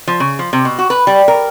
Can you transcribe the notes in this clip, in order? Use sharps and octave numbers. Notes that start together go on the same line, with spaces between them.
F3
C#3
F3
C3
B2
F#4
B4
G3
A#4